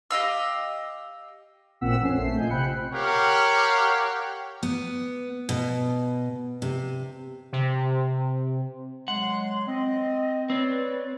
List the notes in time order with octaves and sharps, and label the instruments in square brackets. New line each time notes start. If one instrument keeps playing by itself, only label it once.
[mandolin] G4 D#5 F5 E6
[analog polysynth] A1 A#2 C4 F#5 E6 B6
F2 C4 C#4 G#5 C7
A#1 A3 C7
A#2 F4 D#5 G#5 G6
C3 C4 G5 B5 F#6 C#7
[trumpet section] G4 A#4 C#5 F5 F#5
[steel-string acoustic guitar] B3
B2
C3
[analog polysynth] C3
[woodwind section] F#3 G#3 C6 [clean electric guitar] F#5
[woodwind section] C4 D#5
[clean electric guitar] C4 [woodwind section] B4 C#5 D5